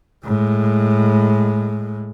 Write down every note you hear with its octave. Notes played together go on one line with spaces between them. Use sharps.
A2 G#3